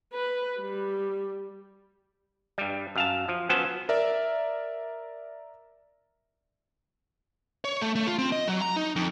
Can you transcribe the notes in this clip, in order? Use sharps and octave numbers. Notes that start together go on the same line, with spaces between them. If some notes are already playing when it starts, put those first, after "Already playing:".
B4
G3
G2 G3
F#2 F5 A5
F3
F3 F#3 B3 C#4 C5 A5
A#4 D5 E5
C#5
A3
A3
F4
C4
D#5
F#3
A#5
D#4
F2